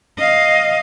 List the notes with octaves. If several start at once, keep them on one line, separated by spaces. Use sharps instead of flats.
D#5 F5